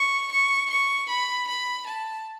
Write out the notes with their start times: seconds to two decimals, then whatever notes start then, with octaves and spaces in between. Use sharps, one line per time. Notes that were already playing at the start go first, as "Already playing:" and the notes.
Already playing: C#6
0.32 C#6
0.70 C#6
1.09 B5
1.47 B5
1.87 A5